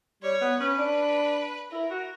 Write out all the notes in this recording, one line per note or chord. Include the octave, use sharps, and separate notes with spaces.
G3 C#5
B3
C#4 B4
D4
E4 A#4
F#4